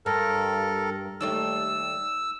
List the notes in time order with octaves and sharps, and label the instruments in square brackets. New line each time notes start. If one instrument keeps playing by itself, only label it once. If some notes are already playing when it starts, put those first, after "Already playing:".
[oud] G2 [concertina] A4 A#4
[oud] D#2 G3 A3 [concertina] E6